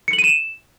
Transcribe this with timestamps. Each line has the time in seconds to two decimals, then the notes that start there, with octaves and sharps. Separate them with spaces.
0.08 C#7
0.13 F#7
0.19 D#7
0.24 E7